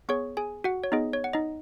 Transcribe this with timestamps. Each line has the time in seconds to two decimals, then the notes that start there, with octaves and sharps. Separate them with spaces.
0.09 B3 G#4 C#5 C#6
0.37 G#4 G#5
0.64 F#4 F#5
0.84 C#5
0.92 B3 D#4 G#4 D#5
1.13 C#5
1.24 F#5
1.33 D#4 D#5